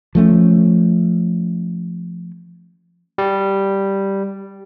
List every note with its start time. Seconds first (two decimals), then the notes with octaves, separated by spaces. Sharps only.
0.15 F3 A3 B3 C#4
3.18 G3